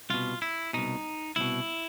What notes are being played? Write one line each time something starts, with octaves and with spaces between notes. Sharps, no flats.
C2 B2 F4
E4
C2 B2 D#4
C2 B2 E4